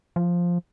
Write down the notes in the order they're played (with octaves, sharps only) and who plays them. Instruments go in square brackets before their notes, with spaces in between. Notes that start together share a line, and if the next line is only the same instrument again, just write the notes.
[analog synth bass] F3